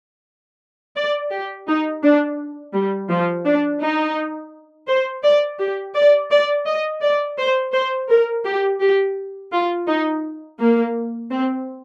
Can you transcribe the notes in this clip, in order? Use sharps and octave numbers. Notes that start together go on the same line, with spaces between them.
D5
G4
D#4
D4
G3
F3
D4
D#4
C5
D5
G4
D5
D5
D#5
D5
C5
C5
A#4
G4
G4
F4
D#4
A#3
C4